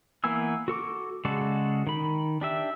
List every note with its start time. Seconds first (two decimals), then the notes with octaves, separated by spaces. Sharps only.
0.24 E3 A#3 B3 G#5 E6
0.68 F#4 A4 C#6 D6
1.25 C#3 G#3 F#4 A4 D5
1.87 D#3 B5
2.41 D4 G4 E5